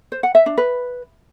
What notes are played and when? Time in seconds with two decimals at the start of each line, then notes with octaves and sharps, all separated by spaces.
0.12 C5
0.23 F#5
0.35 E5
0.46 D4
0.58 B4